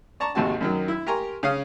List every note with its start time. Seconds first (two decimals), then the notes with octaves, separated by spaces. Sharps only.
0.20 D5 A5 A#5 C#6
0.35 G#1 D#2 C3 F#4 A5
0.61 F#2 D#3 F#3
0.88 E4 E5
1.06 G4 A#4 G#5 A#5 C6 C#6
1.43 C#3 C#4 F5 D#6